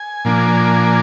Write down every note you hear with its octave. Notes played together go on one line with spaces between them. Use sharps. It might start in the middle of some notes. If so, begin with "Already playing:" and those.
Already playing: G#5
A#2 F3 A#3 D4